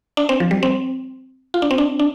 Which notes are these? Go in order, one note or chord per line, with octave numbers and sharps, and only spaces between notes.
D4
C4
F3
G3
C4
F4
D4
C4
D4
D4